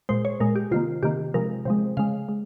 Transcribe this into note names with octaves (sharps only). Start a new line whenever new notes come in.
A#2 G#3 C5
C#5
A#2 G#3 A#4
G4
C3 D#3 A#3 F4
C3 D#3 A#3 G4
C3 F3 G#3 A#4
C3 F3 G#3
C#3 G#3 F5
G#3